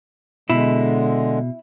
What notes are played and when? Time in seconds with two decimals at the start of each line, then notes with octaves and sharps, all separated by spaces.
0.50 B2 D3 G#3 E4